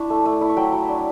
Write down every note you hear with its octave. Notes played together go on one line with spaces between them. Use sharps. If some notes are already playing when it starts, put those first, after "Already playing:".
Already playing: D4 E4 A5 C#6
A3
A3
E4
C#6
F#3 G5 B5
F#3
D4